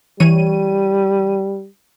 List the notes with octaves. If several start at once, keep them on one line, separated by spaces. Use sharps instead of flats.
E3 G3 C#5 D#7